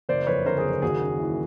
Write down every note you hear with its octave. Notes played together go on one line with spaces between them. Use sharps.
F#1 C5 D5
F2 B4 C#5
D3 A#4 C5
G#4 A#4
F#1
D#2 F#4 G#4
C#3
E3